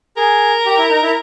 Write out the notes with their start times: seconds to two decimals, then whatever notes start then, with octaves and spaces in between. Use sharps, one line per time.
0.17 G#4 A#4
0.66 G4
0.78 E4
0.90 D#4
1.03 E4